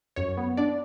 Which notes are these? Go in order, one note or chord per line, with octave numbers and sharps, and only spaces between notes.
F#2 C#5
B3
D4 D5